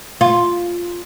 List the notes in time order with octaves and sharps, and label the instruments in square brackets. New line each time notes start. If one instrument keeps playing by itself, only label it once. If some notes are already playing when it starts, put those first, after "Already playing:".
[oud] F4